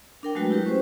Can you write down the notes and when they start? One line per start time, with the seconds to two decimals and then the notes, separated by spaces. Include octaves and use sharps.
0.23 D4 A#4 G5
0.35 F#3 G#3 A3 F#4 B4
0.50 E4 G4 B4
0.66 C#4 F#4 C5